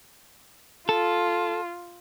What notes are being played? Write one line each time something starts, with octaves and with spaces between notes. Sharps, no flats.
F4 A4